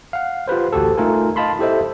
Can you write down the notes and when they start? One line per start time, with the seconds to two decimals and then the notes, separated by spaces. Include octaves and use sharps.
0.13 F5 F#5
0.48 F4 G4 B4 C5
0.73 A1 D2 F#4 G4 A4
0.97 A3 D#4 F4 A#4 G#5
1.36 D#5 F5 A5 B5 C6
1.59 E4 G4 A4 C5 D#5 E5